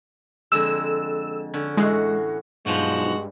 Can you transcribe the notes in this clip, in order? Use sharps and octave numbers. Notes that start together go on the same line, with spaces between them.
F2 D3 G#3 E6
D3 C#4
E2 A2 G#3 F#4
B1 G2 F3 G#3 F#4